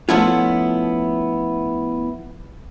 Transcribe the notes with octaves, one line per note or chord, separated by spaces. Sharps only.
F3 A3 B3 C#4 E4 F4